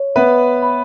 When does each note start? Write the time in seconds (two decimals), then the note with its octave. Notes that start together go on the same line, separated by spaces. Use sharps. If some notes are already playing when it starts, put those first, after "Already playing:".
Already playing: C#5
0.15 B3 B4 E5
0.62 B5